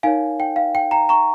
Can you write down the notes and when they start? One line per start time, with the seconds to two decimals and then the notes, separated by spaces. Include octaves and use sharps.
0.03 D#4 A#4 C#5 F5 G#5
0.40 G5
0.56 F5
0.75 G5
0.91 G5 A#5
1.09 A#5 C#6